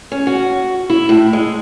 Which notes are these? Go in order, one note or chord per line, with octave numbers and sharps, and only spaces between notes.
C#4
F#4
E4
A2
G#3